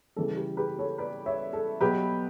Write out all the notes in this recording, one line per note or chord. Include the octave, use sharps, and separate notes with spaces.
C#3 E3 G3 A4
G4 B4
G4 B4
A4 C#5
B4 D5
C#5 E5
A4
B2 F#3 G4 B4